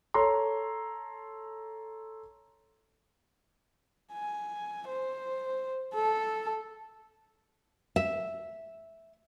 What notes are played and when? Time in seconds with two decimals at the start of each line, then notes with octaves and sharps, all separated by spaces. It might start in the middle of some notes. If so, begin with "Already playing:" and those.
0.14 A4 C#5 A#5 C6
4.13 G#5
4.88 C5
5.94 A4
7.96 E5